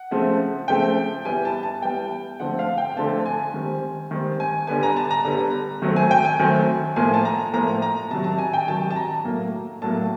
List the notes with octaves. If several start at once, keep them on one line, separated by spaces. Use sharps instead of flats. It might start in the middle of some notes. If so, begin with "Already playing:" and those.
Already playing: F#5
C#3 F3 A3 C4
C#3 F3 A3 C4 G5
E3 G3 B3 G#5
A5
A5
E3 G3 B3 G5
D3 F3 A3 C4 F#5
F5
G5
D3 F3 A3 C4 A5
G#5
D#3 G3 C4
D#3 G3 C4
G#5
D3 G3 B3 G#5
A#5
A5
A#5
D3 G3 B3
D#3 F#3 A3 C4
G#5
G5
G#5
D#3 F#3 A3 C4
A2 F3 A#3 G#5
A5
A#5
A2 F3 A#3 A#5
A#5
C3 D#3 F#3 A5
A5
G#5
G5
G#5
C3 D#3 F#3 A5
A5
A#5
A2 F#3 A#3
A2 F#3 A#3 A5